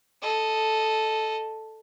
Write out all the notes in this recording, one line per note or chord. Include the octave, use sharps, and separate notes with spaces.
A4 D#5